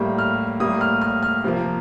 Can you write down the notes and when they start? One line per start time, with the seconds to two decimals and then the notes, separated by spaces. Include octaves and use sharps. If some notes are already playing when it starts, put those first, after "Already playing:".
Already playing: A2 G3 A#3
0.18 F6
0.60 A2 G3 A#3 D#6
0.81 F6
1.02 F6
1.23 F6
1.44 C3 F3 A#3